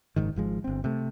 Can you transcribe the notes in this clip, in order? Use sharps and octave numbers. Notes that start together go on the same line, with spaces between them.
F#1 G#2 D#3
G#1 F3 G#3
G1 C4
C3 A3